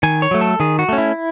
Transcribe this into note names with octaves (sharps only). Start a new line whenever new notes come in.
D#3 G#5
C#5
F#3 A3
A4
D#3 G#4
F#4
A3 C#4
E4